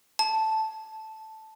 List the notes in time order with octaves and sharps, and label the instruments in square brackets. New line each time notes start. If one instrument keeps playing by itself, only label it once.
[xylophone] A5